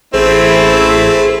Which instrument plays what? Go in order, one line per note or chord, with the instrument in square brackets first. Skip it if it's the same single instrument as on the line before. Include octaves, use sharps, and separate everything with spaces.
[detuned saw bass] A1 [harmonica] A3 C4 [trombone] E4 [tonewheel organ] G#4 C5